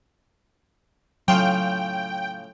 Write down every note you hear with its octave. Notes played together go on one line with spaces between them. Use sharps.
A2 C#3 F#3 F4 G5